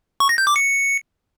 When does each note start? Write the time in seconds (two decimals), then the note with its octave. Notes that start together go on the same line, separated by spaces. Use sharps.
0.20 C#6
0.29 A#6
0.38 G6
0.47 D6
0.56 C#7